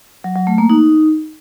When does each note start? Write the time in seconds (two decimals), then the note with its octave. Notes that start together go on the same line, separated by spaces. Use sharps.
0.24 F#3
0.36 F#3
0.47 A3
0.58 A#3
0.70 D#4